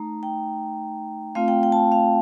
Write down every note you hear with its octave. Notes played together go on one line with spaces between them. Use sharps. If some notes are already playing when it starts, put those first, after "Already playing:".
Already playing: A3 D#4 A#5
G5
A3 C4 F4 F5
G5
G5
A5
F5